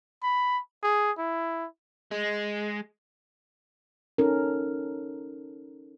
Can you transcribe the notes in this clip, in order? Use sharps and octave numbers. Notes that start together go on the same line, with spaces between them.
B5
G#4
E4
G#3
C#4 D#4 A4 A#4